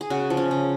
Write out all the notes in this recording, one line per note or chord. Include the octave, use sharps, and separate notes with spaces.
G#4
C#3 F#4
F3
C#4
C#3